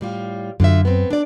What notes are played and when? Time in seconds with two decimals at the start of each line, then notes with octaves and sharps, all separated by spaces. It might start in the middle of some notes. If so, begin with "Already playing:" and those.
0.01 A2 G3 F4
0.60 F#2 D3 F4 E5
0.85 B3 C4
1.10 D4 D5